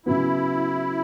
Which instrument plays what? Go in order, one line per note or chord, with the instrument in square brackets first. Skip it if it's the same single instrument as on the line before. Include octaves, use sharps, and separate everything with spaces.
[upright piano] C#3 F#3 B3 [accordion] E4